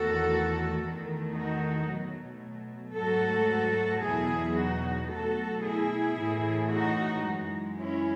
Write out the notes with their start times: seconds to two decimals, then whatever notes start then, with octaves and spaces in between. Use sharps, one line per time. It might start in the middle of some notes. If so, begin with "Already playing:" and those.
Already playing: E2 D#3 A3 F#4 A4
0.83 E2 D#3 A3
1.36 D#4 F#4
1.90 B2 F#3 A3
2.96 G#2 F#3 A3 F#4 A4
4.04 E2 B2 F#3 E4 G#4
4.57 D#4 F#4
5.10 B2 F#3 A3 F#4 A4
5.64 E4 G#4
6.17 A2 E3 A3
6.71 D#4 F#4
7.24 F#2 E3 G#3
7.78 C#4 E4